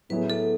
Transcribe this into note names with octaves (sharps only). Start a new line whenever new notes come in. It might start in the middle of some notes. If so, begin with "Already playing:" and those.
A2 F#3 B3 E4 G#4 B4
A4